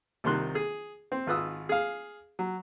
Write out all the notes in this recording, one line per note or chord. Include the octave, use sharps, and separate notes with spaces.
C2 C3 D#3 C6 F#6
G#4
C4
G#1 F4 B4 D#6 E6
G#4 F5
F#3